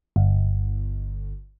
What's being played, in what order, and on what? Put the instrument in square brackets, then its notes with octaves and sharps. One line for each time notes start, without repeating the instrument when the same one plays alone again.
[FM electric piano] G1